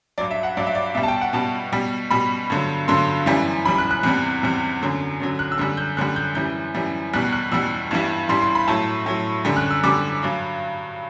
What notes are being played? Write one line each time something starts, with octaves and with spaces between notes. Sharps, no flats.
G2 F#3 D5
E5
F#5
G2 F#3 D5
E5
D5
B2 G3 E5
A5
G5
F#5
B2 G3 A5
B2 G3
B2 G3 B5
G2 D3 F#3
G2 D3 F#3 C6
F#2 E3 G3
F#2 E3 G3 B5
F#6
F#6
E2 C3 G3 F#6
E2 C3 G3
F#2 D3 F#3
F#2 D3 F#3
F#6
E6
F#2 D3 G3 F#6
G6
F#2 D3 G3 F#6
G6
F#2 E3 G3 G6
F#2 E3 G3
E2 B2 G3 F#6
F#6
E2 B2 G3 E6
G2 E3 G3
G2 E3 G3 C6
C6
B5
A2 F#3 A5
A2 F#3
F#2 D3 G3
F#6
E6
F#2 D3 G3 D6
G2 F#3